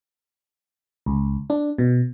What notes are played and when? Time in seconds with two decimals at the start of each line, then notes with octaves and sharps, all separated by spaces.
1.06 C#2
1.50 D4
1.78 B2